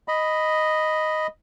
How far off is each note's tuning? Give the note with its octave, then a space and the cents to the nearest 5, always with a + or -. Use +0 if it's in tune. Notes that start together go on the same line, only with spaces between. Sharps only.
D#5 +0 B5 +0